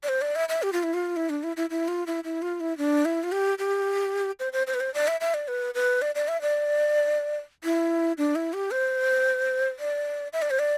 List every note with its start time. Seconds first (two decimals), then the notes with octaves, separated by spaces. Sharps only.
0.03 D5
0.09 C5
0.22 D5
0.35 E5
0.49 E5
0.63 G4
0.73 F4
0.83 E4
0.94 F4
1.16 E4
1.30 D4
1.43 E4
1.57 E4
1.70 E4
1.88 F4
2.07 E4
2.24 E4
2.42 F4
2.60 E4
2.78 D4
3.05 E4
3.24 F4
3.32 G4
3.58 G4
4.40 C5
4.53 C5
4.67 C5
4.74 B4
4.80 C5
4.94 D5
5.08 E5
5.21 E5
5.34 D5
5.48 B4
5.74 B4
6.02 D5
6.15 D5
6.28 E5
6.42 D5
7.64 E4
8.18 D4
8.35 E4
8.53 G4
8.71 C5
9.79 D5
10.33 E5
10.42 D5
10.50 C5
10.59 D5